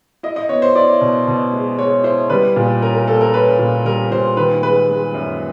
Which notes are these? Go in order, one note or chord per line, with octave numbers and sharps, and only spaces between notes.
E4 D#5
D#5
B3 C#5
C5
E4 D5
B2
B2
G#3
G#3 C#5
E4 C5
G3 B4
A#2
C#4 A#4
A#4
A#3 A4
A#4
C#4 B4
A#2
G3 A#4
A#2 C5
D#3 B4
G#3 B4
G#3
F#2